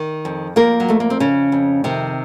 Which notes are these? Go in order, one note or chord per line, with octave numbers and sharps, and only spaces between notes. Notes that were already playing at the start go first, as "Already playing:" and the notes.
Already playing: D#3
F2
F2 A#3 A#4
F#3
F2 A3
A#3
C4
F2 C#3 C#4
F2
C3 D#3 C4